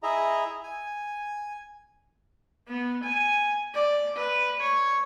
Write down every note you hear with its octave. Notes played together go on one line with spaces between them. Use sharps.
E4 G#4 D#5 E5 A#5
G#5
B3
G#5
D5
B4
C#5